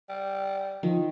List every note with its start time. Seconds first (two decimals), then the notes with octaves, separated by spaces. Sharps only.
0.09 G3
0.83 D#3 F3